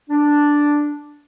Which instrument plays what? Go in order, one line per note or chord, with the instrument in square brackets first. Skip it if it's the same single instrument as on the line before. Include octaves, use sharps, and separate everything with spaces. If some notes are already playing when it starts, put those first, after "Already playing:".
[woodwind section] D4